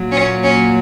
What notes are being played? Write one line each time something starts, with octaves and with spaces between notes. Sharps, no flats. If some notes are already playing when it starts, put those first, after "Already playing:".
Already playing: A#2 F#3 A#3
C#4
C#4